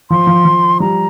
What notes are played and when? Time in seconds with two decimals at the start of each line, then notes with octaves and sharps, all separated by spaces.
0.10 F3 C6
0.27 F3
0.45 F3
0.80 G3 A#5